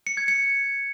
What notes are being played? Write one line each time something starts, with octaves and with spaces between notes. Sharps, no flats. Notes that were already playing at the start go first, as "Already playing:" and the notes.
C#7
G#6
C#7